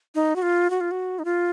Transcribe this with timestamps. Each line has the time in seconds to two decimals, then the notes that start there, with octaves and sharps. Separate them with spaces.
0.15 D#4
0.36 F#4
0.42 F4
0.70 F#4
0.81 F4
0.91 F#4
1.19 D#4
1.25 F4